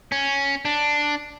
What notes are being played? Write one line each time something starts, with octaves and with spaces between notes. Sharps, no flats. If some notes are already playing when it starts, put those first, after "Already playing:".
C#4
D4